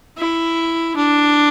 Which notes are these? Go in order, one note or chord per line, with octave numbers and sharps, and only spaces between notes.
E4
D4